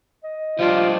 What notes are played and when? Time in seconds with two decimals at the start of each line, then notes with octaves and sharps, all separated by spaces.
0.24 D#5
0.59 F3 G3 D4 F4